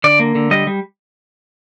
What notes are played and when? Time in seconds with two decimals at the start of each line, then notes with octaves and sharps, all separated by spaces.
0.04 D3 D5
0.20 A#3
0.35 D3
0.51 G3 D#5
0.67 G3